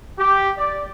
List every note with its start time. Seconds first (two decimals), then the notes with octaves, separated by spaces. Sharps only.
0.18 G4
0.58 D5